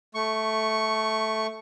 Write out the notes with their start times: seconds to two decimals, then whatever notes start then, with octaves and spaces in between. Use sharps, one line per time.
0.15 A3 C#6